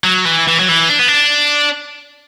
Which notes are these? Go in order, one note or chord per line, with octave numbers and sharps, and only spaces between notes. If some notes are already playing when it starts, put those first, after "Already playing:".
F#3
E3
E3
F#3
E3
D4
B3
D4